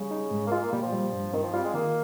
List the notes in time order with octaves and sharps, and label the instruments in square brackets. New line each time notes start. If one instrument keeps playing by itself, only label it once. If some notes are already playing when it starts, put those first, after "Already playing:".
Already playing: [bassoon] C#3 [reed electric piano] G3
[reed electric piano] D#4
G#2
[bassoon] A#3
[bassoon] G#3 [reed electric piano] F4
[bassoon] A#3
[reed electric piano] A#2 [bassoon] G3
[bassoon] F3
[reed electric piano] G3
G2
[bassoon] D#3 [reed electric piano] C4
[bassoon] F3
[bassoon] G3 [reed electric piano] F4
[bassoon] G#3
[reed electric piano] D#3 [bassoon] A#3